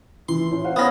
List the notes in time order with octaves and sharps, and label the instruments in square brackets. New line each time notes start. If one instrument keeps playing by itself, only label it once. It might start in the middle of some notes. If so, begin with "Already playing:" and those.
[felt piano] E3 [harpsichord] C6
[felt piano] A2
C5 F5 F#5
[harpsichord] B3 C#4 [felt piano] D#6 A#6